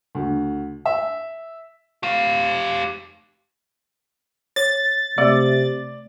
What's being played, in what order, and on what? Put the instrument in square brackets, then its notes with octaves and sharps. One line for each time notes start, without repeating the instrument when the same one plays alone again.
[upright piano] D2
E5
[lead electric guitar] G4 F5
[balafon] C#5 [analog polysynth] A6
[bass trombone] C3 [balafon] A3 [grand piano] D5